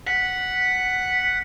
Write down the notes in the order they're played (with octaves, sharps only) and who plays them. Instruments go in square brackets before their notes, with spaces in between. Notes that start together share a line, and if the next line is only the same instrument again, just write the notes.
[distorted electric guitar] F#5 [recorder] B6